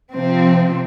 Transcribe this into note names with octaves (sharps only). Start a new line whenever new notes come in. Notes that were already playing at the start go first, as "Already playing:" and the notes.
C3 F3 C4